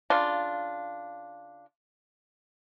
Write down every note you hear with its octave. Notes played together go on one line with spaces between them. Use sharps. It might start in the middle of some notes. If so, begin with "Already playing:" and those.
C#3 D4 F4